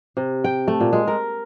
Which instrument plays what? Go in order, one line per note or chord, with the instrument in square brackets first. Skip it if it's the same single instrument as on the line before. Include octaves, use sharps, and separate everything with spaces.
[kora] C3
G5
A3
A#2
G#3
A#4